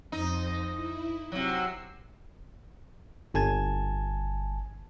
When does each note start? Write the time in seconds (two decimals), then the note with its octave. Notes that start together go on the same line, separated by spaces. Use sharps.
0.12 F2 D#4 C5 A#6
0.75 E4
1.32 C3 F#3 E6 C7
3.34 G1 G#5 A5 G#6